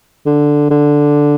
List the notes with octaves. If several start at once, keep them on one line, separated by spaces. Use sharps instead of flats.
D3
D3